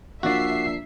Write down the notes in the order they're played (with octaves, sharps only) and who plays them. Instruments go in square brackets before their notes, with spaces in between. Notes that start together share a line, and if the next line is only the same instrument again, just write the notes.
[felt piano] F3 A#3 D4 [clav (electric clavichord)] F#4 D5 [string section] E5 C7